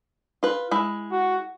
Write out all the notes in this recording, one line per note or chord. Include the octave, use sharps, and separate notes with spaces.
F4 B4
G#3 E4
F#4